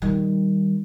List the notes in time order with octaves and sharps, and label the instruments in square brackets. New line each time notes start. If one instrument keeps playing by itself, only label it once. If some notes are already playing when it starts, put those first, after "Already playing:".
[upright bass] D#3 G3